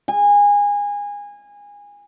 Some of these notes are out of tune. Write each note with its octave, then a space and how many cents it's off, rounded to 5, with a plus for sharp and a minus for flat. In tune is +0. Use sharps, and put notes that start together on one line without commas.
G#5 -25